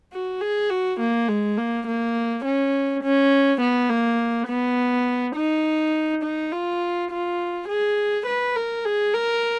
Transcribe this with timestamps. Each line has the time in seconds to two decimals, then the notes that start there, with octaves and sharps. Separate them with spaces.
0.12 F#4
0.41 G#4
0.70 F#4
1.00 A#3
1.28 G#3
1.58 A#3
1.87 A#3
2.45 C#4
3.03 C#4
3.61 B3
3.90 A#3
4.48 B3
5.35 D#4
6.23 D#4
6.52 F4
7.11 F4
7.68 G#4
8.26 B4
8.56 A#4
8.85 G#4
9.14 A#4